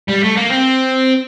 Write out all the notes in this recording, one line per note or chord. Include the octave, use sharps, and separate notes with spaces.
G3
A3
A#3
C4